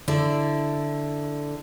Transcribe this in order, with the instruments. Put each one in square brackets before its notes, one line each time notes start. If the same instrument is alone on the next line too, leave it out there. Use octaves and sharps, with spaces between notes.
[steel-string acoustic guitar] D3 E4 D5